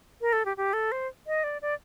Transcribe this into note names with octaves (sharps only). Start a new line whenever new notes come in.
A#4
A4
G4
G4
A4
C5
D#5
D5
D5